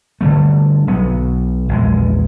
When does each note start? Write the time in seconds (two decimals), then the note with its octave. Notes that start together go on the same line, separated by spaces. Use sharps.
0.21 D3 G3 A3
0.87 B1 F#3 B3
1.69 A#1 E2 G#3